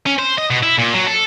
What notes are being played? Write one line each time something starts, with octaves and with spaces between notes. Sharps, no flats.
C#4
C5
D#5
B2
E4
A#2
F#3
A4